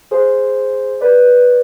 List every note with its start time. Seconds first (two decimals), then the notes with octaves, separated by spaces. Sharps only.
0.11 G#4 C5
1.01 B4 D5